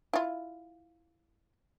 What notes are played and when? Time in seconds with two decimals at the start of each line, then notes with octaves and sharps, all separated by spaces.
0.13 E4 F4